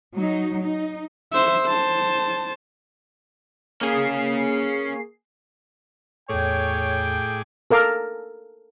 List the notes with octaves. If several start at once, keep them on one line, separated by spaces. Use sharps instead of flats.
F#3 D#4
D#4
C5 E5
C5 A5
A#3 C#4 G#4 F5 C7
E2 A2 G#4 A4 C#5 G5 D6
A4 A#4 F5 D6